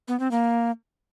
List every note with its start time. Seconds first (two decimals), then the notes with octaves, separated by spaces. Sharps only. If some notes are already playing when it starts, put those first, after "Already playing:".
0.08 B3
0.20 C4
0.31 A#3